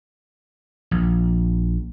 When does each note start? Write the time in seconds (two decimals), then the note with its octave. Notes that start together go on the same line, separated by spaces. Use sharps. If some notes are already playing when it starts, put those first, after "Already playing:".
0.91 A#1